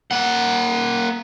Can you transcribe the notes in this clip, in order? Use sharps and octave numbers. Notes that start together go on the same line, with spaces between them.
A#3 F#5